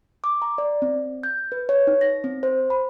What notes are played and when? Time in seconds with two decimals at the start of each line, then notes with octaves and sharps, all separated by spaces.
0.24 D6
0.42 A#5
0.58 D5
0.82 C4
1.23 G6
1.52 B4
1.69 C#5
1.87 D#4
2.01 A#6
2.24 C4
2.43 C5
2.70 B5